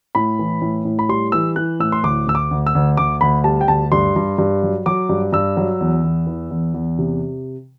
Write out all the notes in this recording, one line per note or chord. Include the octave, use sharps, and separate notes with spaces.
A2 B5
E3
A2
A2
B5
G3 C6
E3 E6
E3 F#6
A2 E6
C6
D2 D6
D2 E6
D6
D2
E6
D2
D2 D6
D2 B5
G3 A5
G5
D2 A5
G2 C6
G2
G2
F#3
F#3 D6
G2
G2 E6
F#3
E2
E2
E3
E2
E2
C3